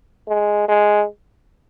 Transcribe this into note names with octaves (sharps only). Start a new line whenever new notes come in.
G#3
G#3